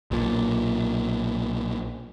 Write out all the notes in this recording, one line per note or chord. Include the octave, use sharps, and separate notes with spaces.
B1 A#2